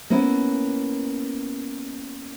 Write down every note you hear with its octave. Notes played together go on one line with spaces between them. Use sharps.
A#3 B3 C#4 E4